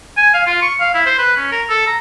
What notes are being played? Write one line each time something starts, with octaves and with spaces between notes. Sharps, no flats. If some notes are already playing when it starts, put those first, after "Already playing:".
G#5
F5
F4
C#6
F5
E4
C5
B4
C#4
A#4
A4
A#5